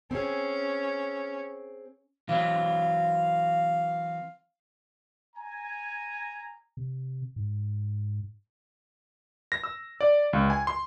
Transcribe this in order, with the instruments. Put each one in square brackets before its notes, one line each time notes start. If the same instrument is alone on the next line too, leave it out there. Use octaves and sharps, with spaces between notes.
[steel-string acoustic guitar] C4 G#4 [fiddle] C#4
[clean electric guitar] E3 F#3 C4 [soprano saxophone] F5
[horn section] G#5 A#5
[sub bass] C3
G#2
[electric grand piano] A#6
E6
D5
C#2
G#5
C6